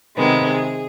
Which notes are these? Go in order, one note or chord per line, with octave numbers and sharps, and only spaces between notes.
C3 D#3 G#3 B3
G#4